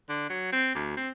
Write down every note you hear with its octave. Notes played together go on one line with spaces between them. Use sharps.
D3
F#3
C4
D2
C4